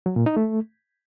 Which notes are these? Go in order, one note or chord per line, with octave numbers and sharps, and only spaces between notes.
F#3
A#2
D#4
A3